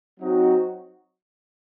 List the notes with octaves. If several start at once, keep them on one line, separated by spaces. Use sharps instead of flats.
F#3 C4 D#4 F#4